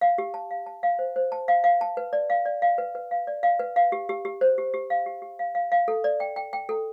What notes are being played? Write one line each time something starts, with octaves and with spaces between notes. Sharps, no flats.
F5
G4
A5
F5
A5
F5
C5
C5
A5
F5
F5
A5
B4
D5
F5
D5
F5
B4
B4
F5
D5
F5
B4
F5
G4
G4
G4
C5
G4
G4
F5
G4
G4
F5
F5
F5
A4
D5
G5
G5
G5
A4